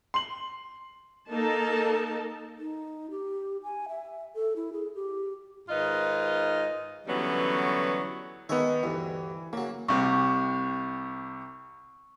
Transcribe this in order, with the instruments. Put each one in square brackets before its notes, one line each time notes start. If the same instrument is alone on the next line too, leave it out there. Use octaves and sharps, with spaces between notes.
[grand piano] C6 F#7
[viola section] A#3 D#4 A4 A#4 A5
[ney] D#4
G4
G#5
E5
A4
E4
G#4
G4
[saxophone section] G#2 D#3 D#4 F4 B4 D#5
D3 E3 F#3 G3 B3 C#4
[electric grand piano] D#3 B3 [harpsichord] G#3 C#5 E5
[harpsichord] D2 G2 [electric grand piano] E3
[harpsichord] C#3 F#3 [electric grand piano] A#3
[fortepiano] C2 C3 [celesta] C#6